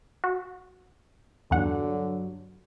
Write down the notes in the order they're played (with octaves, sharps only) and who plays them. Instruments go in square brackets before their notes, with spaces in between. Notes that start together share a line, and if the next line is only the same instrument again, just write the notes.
[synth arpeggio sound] F#4
[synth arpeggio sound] E2 F#5 [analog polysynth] G2 F#3 [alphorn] D3